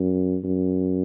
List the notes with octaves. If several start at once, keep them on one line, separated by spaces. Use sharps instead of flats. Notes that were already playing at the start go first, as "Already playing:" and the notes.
Already playing: F#2
F#2